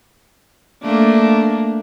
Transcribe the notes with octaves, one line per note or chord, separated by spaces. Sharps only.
A3 A#3 D4